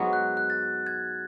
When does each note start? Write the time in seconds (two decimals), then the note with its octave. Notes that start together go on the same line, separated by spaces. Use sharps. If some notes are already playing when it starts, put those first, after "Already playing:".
Already playing: G#2 F#3 B3 F#4
0.13 F#6
0.37 F#6
0.50 A6
0.87 G#6